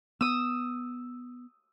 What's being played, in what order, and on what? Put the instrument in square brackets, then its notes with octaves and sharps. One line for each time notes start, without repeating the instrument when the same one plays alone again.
[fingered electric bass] B3 [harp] D#6 E6